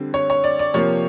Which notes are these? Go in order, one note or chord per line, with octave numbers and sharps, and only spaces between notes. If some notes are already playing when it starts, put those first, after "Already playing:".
Already playing: D3 G3 C4
C#5
C#5
D5
D5
C3 F3 A#3 C#5